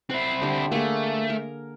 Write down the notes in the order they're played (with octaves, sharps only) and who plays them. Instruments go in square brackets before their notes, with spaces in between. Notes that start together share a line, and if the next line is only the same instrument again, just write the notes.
[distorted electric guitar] C4 E4 [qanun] C5 F#5
[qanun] D3 G4
[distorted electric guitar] A3 [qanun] A#3 G#4
[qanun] A#4